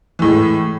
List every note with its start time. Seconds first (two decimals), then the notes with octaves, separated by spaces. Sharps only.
0.19 E3
0.22 A2
0.25 G#3